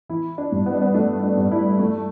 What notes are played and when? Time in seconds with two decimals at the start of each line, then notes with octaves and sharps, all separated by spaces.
0.09 E3 E4
0.38 D4
0.52 G2
0.66 B3
0.74 D4
0.82 B3
0.94 A3 D4
1.23 D4
1.37 G2
1.51 E4
1.79 A3